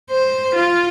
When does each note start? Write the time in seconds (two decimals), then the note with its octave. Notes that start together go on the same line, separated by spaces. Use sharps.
0.11 C5
0.55 F4